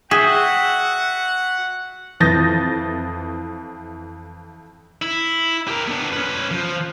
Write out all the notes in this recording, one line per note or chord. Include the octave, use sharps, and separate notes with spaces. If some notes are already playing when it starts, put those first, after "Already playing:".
F#4 G#4 E5 F#5 G5
F2 E3 D#6 G6 A6 A#6
E4
G4 A#4
B3 D4
C#4 B4
F3